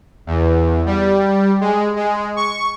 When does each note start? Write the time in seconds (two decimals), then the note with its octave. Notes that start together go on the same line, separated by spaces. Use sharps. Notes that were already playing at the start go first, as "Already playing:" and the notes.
0.27 E2
0.86 G3
1.61 G#3
1.96 G#3
2.36 C#6